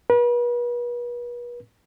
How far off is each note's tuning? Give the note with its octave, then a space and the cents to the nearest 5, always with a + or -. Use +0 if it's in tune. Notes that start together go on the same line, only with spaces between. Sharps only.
B4 -40